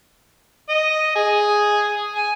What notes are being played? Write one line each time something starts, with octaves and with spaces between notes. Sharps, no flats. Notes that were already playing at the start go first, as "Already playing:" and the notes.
D#5
G#4
G#5